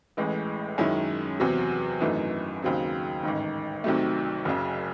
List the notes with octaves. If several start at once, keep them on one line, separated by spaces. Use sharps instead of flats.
A1 A2 E3 G#3
F#2 D#3 G#3 C#4 E4
E2 C3 F#3
G#1 F#2 E3 A3 D#4
D#2 C#3 F#3 C4
A1 G#2 D#3
C2 C3 D#3 F#3 A3
F#1 F#2 C#3